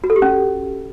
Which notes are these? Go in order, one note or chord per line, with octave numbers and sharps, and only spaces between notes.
F#4
A4
G4
C#4